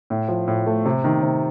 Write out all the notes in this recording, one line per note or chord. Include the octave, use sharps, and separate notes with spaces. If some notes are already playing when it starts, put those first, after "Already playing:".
A2
F3
A2
A3
C3
D#3
C3